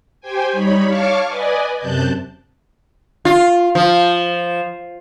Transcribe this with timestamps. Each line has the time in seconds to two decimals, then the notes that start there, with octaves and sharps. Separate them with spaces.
0.21 G4 C5 G5 G#5
0.52 G3 D#4 C#5 B5
0.86 C#5 F5 A5 C#6 D6 F6
1.27 B4 D5 D#5 G#5
1.79 F#2 C3 A5 F#6 G6
3.25 F4
3.75 F3